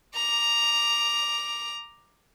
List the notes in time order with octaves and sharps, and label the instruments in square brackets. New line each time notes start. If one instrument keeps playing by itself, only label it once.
[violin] A#5 D6